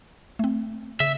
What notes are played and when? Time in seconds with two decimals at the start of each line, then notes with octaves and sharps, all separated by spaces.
0.39 A3 C4
1.00 C#3 E5